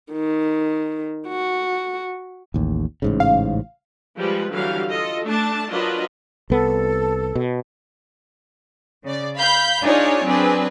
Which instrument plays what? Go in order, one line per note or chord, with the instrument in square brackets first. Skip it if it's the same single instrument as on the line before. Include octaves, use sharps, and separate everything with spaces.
[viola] D#3
F#4
[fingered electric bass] A1 D#2
A1 G#2 C#3
[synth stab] F5
[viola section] F3 G3 G#3 F4 B4
D3 E3 F#3 G3 F5
F4 A4 D#5
A3 D4 A5
F#3 D4 F4 A#4 B4 D#5
[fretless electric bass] C2 B3 [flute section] A4
[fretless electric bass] B2
[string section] C#3 D5
F5 B5 G6
D4 D#4 F4 G#4 C#5 D5
F#3 C4 D4 G#4 B4